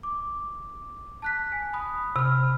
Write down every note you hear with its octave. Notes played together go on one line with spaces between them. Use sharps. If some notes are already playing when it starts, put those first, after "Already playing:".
D6
A5 F#6 B6
G#5
B5 D#6
C3 B5 F6